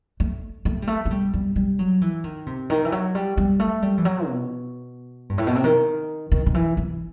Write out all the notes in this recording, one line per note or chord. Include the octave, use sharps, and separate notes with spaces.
A3
A3
G3
A3
A3
G3
G3
G3
F#3
E3
D#3
C3
D#3
E3
F#3
G3
G3
A3
G3
E3
F#3
B2
G2
A2
B2
C3
D#3
D#3
D#3
E3
E3